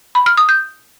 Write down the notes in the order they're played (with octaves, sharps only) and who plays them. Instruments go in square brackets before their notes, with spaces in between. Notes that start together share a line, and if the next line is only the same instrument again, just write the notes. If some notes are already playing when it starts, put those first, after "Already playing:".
[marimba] B5
F6
D#6
G6